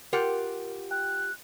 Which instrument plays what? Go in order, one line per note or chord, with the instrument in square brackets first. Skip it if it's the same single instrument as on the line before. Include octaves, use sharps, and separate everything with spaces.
[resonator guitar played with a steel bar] F4 G4 F#5 [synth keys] A#4
[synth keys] G5 [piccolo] F#6